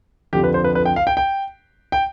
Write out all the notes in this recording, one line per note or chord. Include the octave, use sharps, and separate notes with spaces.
F2 D3 F3 G4
B4
C5
B4
B4
G5
F5
G5
G5
G5